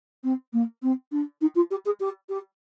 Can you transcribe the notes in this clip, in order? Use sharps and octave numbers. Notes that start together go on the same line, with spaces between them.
C4
A#3
C4
D4
D#4
F4
G4
G#4
G4
G4